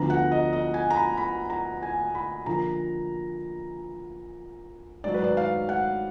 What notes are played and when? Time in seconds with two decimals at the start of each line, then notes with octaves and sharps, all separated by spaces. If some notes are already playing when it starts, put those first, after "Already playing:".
Already playing: D2 D3 F3 B3 A#5
0.10 F#5
0.32 D#5
0.53 D#5
0.74 G#5
0.90 A#5
0.96 B5
1.17 B5
1.50 A#5
1.83 G#5
2.15 B5
2.46 D3 F3 A#3 F4 A#5
5.04 G#2 D#3 F#3 D5
5.14 B4
5.24 D5
5.37 F5
5.69 F#5